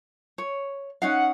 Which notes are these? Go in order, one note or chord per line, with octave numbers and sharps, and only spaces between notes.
C#5
C#4 D#4 F5 F#5